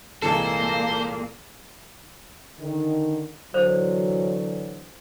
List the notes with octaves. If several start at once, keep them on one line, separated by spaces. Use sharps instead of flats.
C2 A#2 E3 G#3 A#3 A4 C5
D3 D#3
D3 E3 F#3 C5